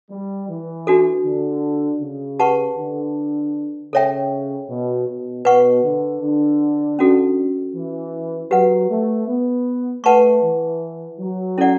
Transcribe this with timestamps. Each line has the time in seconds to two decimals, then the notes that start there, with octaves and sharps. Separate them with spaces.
0.11 G3
0.49 E3
0.87 D4 F#4 A4
1.25 D3
2.02 C#3
2.39 G4 B4 F#5 A5 C#6
2.78 D3
3.93 C#3 A4 C#5 E5 G5
4.69 B2
5.08 B2
5.45 B2 B4 F#5 C#6
5.84 D3
6.22 D3
6.99 C#4 F#4 A4
7.75 E3
8.51 F#3 G4 B4 F#5
8.90 A3
9.28 B3
10.04 A3 B4 F#5 A5 C#6
10.42 E3
11.19 F#3
11.58 C#4 E4 A4 D5 F#5